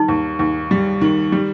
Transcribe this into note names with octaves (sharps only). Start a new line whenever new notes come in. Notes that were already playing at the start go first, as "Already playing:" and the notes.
Already playing: D#3 G3 D#4
D#2
D#2
G3
D#3
G3